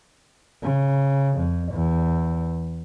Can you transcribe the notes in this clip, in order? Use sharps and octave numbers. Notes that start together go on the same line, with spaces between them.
C#3
F2
E2